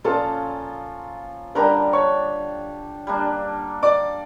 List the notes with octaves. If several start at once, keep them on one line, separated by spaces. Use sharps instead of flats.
A#2 F3 C#4 F4 A4 A5
D3 G3 D4 G4 A#4 A#5
C#5 C#6
G3 A#3 D4
D5 D6